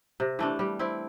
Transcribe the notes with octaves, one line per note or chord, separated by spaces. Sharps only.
C3
E3 A3 D4
G3
C4 E4